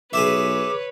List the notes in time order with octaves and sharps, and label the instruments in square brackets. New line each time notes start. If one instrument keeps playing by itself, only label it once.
[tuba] B1 [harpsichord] G#4 E5 [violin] B4 C#5 [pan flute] D6